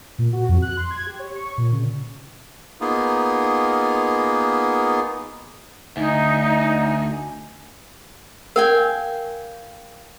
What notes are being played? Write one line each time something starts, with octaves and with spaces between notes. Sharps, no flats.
A#2
F#4
F2
F#6
C6
G#6
G4
C#5
C#6
A#2
C#3
A#3 B3 D#4 F4 G#4
D2 D#4 G#5
A#4 F5 G5 G#5